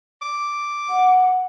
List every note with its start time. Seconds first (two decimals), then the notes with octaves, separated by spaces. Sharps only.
0.22 D6
0.90 F#5